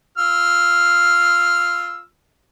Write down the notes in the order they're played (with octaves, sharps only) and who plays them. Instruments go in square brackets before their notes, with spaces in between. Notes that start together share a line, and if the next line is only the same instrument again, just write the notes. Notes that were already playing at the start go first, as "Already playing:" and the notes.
[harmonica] F4 E6 F6